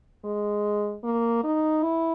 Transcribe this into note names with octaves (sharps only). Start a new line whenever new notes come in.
G#3
A#3
D#4
E4